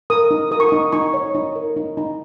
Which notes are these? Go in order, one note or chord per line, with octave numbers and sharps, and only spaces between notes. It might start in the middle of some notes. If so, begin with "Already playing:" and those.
A#4 D#6
D#4
A#4 D#6
C#6
D#6
D#4
D#4 C#6
C#5
D#4
A#4
D#4
D#4